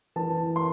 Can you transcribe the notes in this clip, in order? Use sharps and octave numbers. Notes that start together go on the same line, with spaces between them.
E3 A5
C6